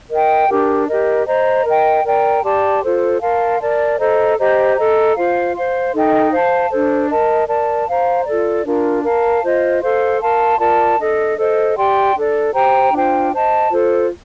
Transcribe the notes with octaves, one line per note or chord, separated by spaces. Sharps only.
A#4 D#5 G5
D4 G4 A#4
G4 A#4 D#5
C5 D#5 A#5
A#4 D#5 G5
A#4 D5 G5 A#5
G4 D5 A5 C6
F4 A4 C5
A#4 F5 A5 C6
A#4 D5 A5
A4 C5 D#5 A#5
G4 C5 D#5 A#5
A4 D#5 A#5
F4 C5 F5
C5 F5 C6
D#4 A4 D#5 G5
C5 F5 A5
D4 A4 C5
A#4 D#5 A5
A#4 D5 A5
C5 F5 A#5
F4 A4 D5
D4 F4 A#4
A#4 F5 A5
F4 C5 D#5
A4 C5 F5 C6
A#4 F5 A5 C6
F4 A#4 D5 A5
D4 A4 D#5
A4 C5 D#5
G4 D5 G5 C6
D4 A4 D5
G4 C5 G5 A#5
D4 F4 C5 G5
C5 D#5 A5
F4 A4 C5